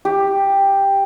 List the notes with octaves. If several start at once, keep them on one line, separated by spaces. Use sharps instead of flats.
G4